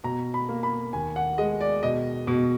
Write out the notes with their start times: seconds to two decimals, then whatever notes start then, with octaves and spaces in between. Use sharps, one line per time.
0.04 B2 A#5
0.34 B5
0.49 A#3
0.63 B5
0.93 D#2 G#5
1.16 F#5
1.38 G#3 D#5
1.61 D5
1.83 B2 D#5
2.27 B2